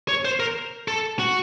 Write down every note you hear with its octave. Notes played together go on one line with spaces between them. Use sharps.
C#5
C5
A#4
A4
F#4